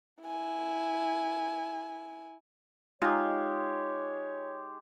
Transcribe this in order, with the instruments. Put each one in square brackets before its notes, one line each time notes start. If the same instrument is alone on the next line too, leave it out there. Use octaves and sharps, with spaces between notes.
[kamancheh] E4 G#5
[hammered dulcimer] G#3 G4 [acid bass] D#4 [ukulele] F4 [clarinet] C#5